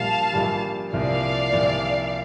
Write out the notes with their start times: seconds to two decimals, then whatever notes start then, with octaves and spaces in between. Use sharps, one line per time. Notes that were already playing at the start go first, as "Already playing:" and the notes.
Already playing: A#1 A#2 G3 F5 A5
0.33 A#1 A#2 G3
0.93 C2 A#2 F3 D5 F5
1.53 C2 A#2 F3